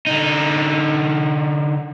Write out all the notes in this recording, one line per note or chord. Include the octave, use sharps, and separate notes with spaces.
D3 D#4